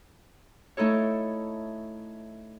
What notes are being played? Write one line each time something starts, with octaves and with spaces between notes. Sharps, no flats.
A3 D#4 E4 A4 C#5